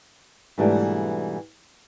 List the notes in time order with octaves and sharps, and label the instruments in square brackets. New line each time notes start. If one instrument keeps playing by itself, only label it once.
[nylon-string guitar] G#2 B2 E3 G3 A3 D4